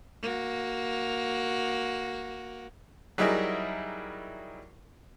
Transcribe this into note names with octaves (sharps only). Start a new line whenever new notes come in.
A#3 F#4
F#3 G3 D#4 E4 G#4 A#4